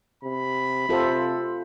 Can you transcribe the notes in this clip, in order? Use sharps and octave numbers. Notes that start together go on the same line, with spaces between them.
C3 B5
C3 F4 A4 C5